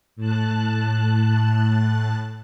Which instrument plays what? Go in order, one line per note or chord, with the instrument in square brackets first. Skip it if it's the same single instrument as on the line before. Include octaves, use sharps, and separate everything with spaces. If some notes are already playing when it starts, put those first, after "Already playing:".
[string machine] A2 A5 F#6